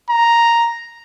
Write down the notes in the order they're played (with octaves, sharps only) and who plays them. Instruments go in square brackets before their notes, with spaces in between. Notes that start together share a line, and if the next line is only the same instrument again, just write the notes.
[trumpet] A#5